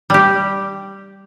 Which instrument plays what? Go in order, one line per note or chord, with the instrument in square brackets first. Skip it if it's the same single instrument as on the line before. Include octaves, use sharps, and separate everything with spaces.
[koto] G3 G4